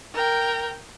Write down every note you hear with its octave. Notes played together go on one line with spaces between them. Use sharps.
A#4 G5